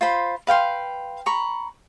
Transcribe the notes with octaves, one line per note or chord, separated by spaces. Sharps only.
F4 C5 B5
B4 F5 G5 C6
A#5 B5 C#6